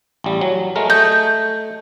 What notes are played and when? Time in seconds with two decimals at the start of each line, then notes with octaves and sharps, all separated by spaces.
0.24 A1 G3
0.41 F#3
0.76 G#3 A3 A#4
0.90 A3 D#5 G6